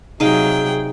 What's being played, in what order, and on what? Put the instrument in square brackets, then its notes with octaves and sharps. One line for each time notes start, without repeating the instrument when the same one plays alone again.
[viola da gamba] C3 F#3 [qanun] D#4 D#5 F5 [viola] G#4 G5